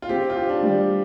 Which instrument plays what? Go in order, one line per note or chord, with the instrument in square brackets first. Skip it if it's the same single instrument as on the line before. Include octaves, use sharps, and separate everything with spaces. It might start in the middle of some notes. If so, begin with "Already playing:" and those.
[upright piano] F4
[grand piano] C4 [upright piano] G4
[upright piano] F4
[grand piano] G4
[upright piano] D4
[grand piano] G3